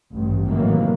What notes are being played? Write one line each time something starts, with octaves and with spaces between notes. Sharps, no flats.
A1 G2
A2 C3 D#3 E3 F#3 A#3